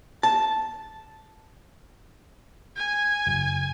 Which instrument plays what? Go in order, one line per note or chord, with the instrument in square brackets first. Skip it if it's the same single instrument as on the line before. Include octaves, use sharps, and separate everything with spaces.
[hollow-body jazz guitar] A5
[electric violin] G#5
[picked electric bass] F#1